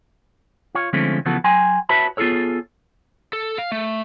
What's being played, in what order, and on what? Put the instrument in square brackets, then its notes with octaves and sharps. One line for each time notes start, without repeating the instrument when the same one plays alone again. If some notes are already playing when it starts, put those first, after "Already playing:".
[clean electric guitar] F4 C#5
D3 F3 G#3 A3 C4 C#4
C#3 E3 F3 B3 F#4 A4
F#3 G5 G#5 C6
F#4 B4 C#5 E5 A5 B5
B3 F4 F#4 G#4 A4 C#5
[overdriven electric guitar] A4
F5
A3